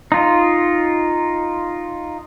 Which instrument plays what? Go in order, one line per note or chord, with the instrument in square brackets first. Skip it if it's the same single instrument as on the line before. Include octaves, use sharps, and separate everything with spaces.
[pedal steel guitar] D#4 F4